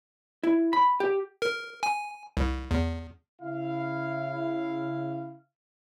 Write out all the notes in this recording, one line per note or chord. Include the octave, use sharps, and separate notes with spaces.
E4
B5
G4
A#4
G#5
C2
E2
C#3 E4 F5